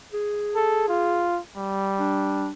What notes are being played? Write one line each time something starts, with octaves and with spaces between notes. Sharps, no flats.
G#4
A4
F4
G3
D4